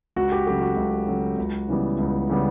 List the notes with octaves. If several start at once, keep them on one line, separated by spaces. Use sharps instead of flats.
C#2 F#4
G4
C#3 F#3 A3 G4
F#4
C#2
C#3 F#3 A3
C#2
C#3 E3 G3 B3
C#2
C#3 E3 G3 B3